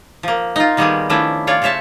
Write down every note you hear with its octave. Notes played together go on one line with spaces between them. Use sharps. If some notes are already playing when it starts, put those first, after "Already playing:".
F3 A#3
D#4 F4
D#3 G3 A#3 B3 G4 G#4
D#3 F3 A3 C#4 D4 E4
F4 C#5 D5
C#3 C5 C#5 E5 A5